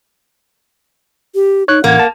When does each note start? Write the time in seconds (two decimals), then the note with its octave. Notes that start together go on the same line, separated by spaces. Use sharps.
1.35 G4
1.68 D#4 C#5 F#6
1.84 A1 A#3 F#5 G#6
1.99 A5